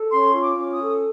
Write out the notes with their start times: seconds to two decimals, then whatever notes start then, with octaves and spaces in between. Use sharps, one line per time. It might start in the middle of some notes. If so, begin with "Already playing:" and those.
Already playing: A4
0.11 C#4 C6
0.34 F4
0.42 D6
0.56 C#4
0.72 D#6
0.80 A4